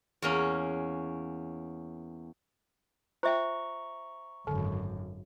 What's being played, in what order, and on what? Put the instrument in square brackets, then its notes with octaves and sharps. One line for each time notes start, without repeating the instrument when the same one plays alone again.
[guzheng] E2 A#3 C#4
[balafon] F4 G5 [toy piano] C5 E5 [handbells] A#5 C#6
[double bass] G#1 F#2 [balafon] D3